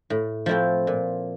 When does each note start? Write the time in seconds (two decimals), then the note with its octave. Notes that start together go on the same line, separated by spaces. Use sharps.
0.10 A2
0.46 F3 A3 C4 E4
0.87 A#2